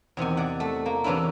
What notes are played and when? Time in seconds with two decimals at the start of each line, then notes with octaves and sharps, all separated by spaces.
0.17 E2 C3 D#3 G#5
0.37 D5 F#5
0.60 A3
0.86 A#3
1.04 C3 E3 C#4 D4 E4